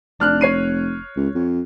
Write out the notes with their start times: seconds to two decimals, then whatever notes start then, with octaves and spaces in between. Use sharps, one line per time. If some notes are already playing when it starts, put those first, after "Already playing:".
0.20 F1 D4 F6 F#6
0.41 C#5 C7 D#7
1.17 C#2
1.35 F2